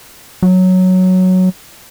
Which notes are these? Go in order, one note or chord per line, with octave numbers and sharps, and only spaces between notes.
F#3